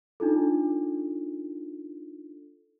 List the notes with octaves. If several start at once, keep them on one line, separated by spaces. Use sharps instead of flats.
D4 D#4 F4 A4